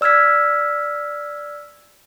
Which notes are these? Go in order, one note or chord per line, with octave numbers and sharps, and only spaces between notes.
D5 E6 F6 G#6 B6